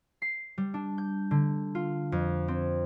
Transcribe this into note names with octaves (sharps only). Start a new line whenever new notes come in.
C7
G3
D4
G6
D3
F4
F2
C4